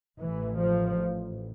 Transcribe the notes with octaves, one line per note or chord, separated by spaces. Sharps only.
A1 A2 E3
F3